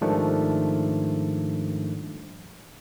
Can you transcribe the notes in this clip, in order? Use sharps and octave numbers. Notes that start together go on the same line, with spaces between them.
G#2 D#3 F3 G3 A3 D4